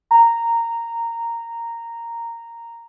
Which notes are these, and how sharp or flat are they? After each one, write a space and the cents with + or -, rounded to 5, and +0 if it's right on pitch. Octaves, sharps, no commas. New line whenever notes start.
A#5 -10